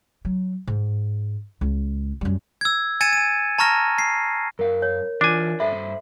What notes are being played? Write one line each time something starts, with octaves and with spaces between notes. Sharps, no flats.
F#3
G#2
C#2
F#2 G3
E6 G#6
G#5 G#6 A6 C#7 D#7 E7
G#5 D#7
A5 A#5 C#6 F6 A#6
C7
F#2 A#4 F5
C#5
E3 D4 F4 G#5 D6
G2 A4 C5 E5 B5